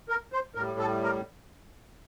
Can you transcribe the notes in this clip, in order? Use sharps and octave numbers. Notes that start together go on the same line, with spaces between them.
A#4
C5
A2 G3 A#4
A4
A#4